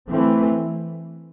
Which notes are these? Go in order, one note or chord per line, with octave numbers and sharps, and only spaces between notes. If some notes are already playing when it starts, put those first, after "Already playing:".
E3 A3 C4